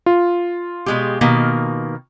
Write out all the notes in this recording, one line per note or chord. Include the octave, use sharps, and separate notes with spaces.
F4
B2 G#3 G4
B2 D#3 A#3